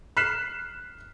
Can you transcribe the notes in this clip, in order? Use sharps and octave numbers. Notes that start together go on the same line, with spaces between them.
F6 F#6 B6 C7 E7